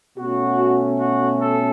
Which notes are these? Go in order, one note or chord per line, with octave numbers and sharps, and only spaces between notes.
B2 A3 C#4 F#4
F#4
A4